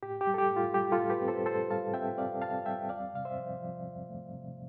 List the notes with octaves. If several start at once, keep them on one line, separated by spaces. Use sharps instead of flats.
A2 G4
G4
G3
A4
G4
A2
F4
G3 G4
F4 A4
A2
G4 B4
C4
A4 C5
A2 A4 C5
G3 F5 A5
C4 E5 G5
C4 D5 F5
C4 F5 A5
G3 E5 G5
E2 D5 F5
C3 F5
C5 E5
F3
F3
E2
A3
C3